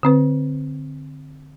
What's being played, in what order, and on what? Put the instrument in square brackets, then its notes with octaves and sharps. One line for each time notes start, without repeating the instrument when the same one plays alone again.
[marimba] D3 C4 B4